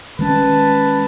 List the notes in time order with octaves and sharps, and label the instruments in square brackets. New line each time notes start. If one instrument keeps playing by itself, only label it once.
[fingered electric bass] D#3 G#3 C#4 [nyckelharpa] B4 A5